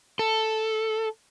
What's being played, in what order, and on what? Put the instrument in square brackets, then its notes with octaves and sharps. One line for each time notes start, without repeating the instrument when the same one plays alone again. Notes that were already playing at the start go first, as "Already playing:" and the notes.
[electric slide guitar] A4